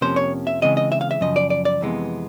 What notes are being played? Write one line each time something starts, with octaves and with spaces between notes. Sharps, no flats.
F2 C3 F3 A#3 C#4 C5
C#5
E5
C#3 E3 G#3 C4 D#5
D#5
E5
F5
E5
F#2 C#3 F3 D#5
D5
D5
D5
F2 C3 E3 G#3 B3